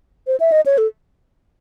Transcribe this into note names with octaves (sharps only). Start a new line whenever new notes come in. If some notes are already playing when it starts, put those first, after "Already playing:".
C5
E5
D#5
C#5
A4